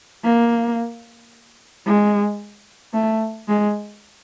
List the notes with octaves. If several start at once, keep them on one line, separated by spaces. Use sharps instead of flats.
A#3
G#3
A3
G#3